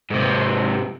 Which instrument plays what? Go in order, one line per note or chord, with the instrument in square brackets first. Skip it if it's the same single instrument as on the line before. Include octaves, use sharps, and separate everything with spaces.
[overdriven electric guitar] G#2 C3